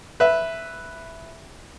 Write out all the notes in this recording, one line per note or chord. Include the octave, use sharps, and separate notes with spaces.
B4 E5